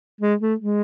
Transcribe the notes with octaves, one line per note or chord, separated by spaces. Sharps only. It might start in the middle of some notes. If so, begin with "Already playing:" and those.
G#3
A3
G#3